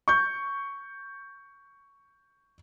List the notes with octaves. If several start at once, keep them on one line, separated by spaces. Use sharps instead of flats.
C#6 G6